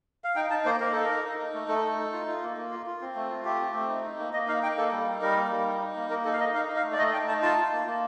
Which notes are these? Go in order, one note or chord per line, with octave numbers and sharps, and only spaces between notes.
F5
D#4 G5
D#4 A5
A#3 C5
A#3 A#4
D#4 A4
A#4
D#4
D#4
D#4
A3
A3 A4
D#4
D#4
F4
F4
A#3
A#3
F4
F4
C4
A3
F4
A3 G4
C4
A3
D#4
D#4
A#3
A#3 D#5
D#4 F5
D#4 G5
A#3 A4
G3
D#4
G3 A#4
A#3
G3
D#4
D#4
A#3
A#3 A#4
D#4 A4
F5
D#4 D#5
D#4 F5
D#4
F5
A3
D5
A3 D#5
D#4 G5
D#4 A5
F4 A5
F4
A#3
A#3